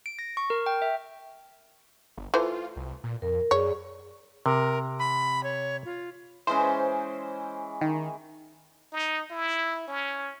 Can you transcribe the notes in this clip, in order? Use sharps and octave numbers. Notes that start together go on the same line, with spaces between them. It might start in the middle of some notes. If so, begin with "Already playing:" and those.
D7
A#6
C#6
A#4
G5
E5
G1
E3 A3 F4 C5
C2
A#2
F2 A#4
F#2 G#4 C#5 D5
C3 A#4
B5
C#5
F4
E3 G#3 C#4 C5
D#3
D#4
E4
C#4